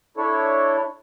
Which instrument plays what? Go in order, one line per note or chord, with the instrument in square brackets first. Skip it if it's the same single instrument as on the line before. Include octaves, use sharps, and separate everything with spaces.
[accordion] D4 E4 A4 C#5